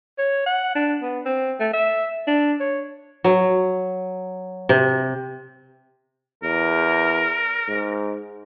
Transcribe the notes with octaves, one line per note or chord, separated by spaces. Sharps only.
C#5
F#5
D4
B3
C4
A3
E5
D4
C#5
F#3
C3
E2 A#4
G#2